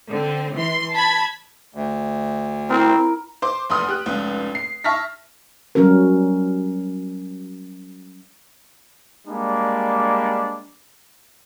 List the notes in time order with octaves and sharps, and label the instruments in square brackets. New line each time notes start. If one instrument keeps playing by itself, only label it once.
[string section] D3 C4
E3 C6
A5 B5 G#6
[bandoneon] D2
[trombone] C4 [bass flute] E4 [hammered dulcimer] A#4
[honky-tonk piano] C5 C6 D6
F1 E2 B5 C6 D#6 F6
G4 F#6
F1 C#2
C7
E5 A5 C#6 F6 A#6 B6
[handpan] F#3 G3 C#4 F#4 A#4
[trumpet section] G3 G#3 A#3 D4